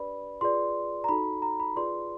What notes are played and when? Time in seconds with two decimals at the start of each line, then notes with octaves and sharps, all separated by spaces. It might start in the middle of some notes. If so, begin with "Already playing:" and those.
Already playing: D4 G4 B4 D5 B5
0.41 F4 G#4 B4 D5 C6
1.04 A#5
1.09 D#4 F#4 A4 B5
1.42 A#5
1.60 B5
1.76 F4 G#4 B4 D5 C6